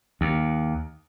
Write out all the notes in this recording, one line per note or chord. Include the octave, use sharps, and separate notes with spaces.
D#2